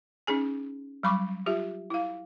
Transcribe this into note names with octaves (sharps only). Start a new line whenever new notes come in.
C#4 D#4 G#4 G#5
F#3 G3 B5 C#6 D6
F4 G4 E5
E4 F5